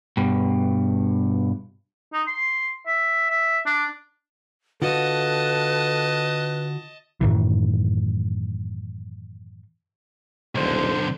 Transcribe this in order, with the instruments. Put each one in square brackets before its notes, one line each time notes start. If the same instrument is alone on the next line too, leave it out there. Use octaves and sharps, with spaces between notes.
[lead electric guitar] G2 B2
[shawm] D#4
C6
E5
E5
D4
[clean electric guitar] D3 F4 F#4 [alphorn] A4 [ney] B4 [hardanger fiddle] D#5 A5
[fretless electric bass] F#2 A2 D#3 E3
[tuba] D#1 [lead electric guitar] B1 D3 [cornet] C5